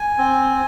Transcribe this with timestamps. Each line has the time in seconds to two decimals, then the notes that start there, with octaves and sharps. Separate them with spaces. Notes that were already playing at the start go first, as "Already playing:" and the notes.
Already playing: G#5
0.18 C4